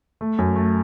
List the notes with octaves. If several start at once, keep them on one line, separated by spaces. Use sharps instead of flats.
A3
F#2
A3